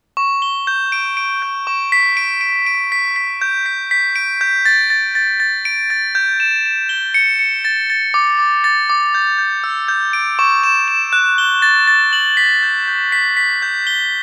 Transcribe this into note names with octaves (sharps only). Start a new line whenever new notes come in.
C#6
G7
G6
D7
D7
G6
C#6
B6
D7
D7
D7
B6
B6
G6
B6
B6
D7
G6
A6
A6
A6
A6
D7
A6
G6
E7
E7
G7
C#7
C#7
A6
A6
D6
D6
A6
D6
G6
G6
E6
G6
D7
C#6
E7
E7
F#6
G7
A6
A6
F#7
B6
G6
G6
B6
B6
G6
G7